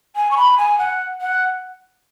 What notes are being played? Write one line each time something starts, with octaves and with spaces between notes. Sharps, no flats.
G#5
C#6
B5
G#5
F#5
F#5